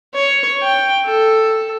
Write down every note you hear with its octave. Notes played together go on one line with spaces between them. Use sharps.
C#5
G5
A4